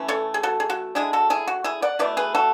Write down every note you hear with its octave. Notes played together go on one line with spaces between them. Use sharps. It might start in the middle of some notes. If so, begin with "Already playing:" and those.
Already playing: E3 A3 C#4 E4
A4 C#5
G#4
F#4 A4
G#4
F#4
D3 G#3 D4 E4 G#4
F#4 A4
E4 G#4
F#4
E4 G#4
D5 F#5
B2 A3 E4 B4 D5
G#4 B4
F#4 A4